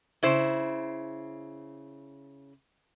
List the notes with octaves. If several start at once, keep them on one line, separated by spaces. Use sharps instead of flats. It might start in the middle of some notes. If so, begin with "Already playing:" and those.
C#3 E4 C5